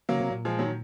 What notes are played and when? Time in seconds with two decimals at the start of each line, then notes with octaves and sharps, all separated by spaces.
0.09 C#3 F#3 A#3
0.20 C3
0.31 A#2
0.45 F3 G#3
0.59 D#3 F#3